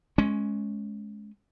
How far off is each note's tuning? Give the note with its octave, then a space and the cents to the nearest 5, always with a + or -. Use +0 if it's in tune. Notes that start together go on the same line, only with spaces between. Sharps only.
G#3 +20 C#4 +0